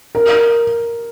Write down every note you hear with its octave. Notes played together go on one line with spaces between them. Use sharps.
A#4